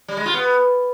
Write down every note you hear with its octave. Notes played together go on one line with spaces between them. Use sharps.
G3
G#3
F4
B3